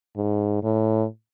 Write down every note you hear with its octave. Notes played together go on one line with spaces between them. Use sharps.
G#2
A2